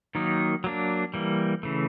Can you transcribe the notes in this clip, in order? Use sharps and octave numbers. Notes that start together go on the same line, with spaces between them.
D#3 F#3 A#3 D#4
F#3 A#3 D4
E3 G3 A#3
C#3 E3 A3